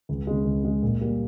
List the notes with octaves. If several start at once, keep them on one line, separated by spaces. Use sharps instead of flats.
C#2
C#3 G#3
C#2
C#3 G#3
A#2
G3 A#3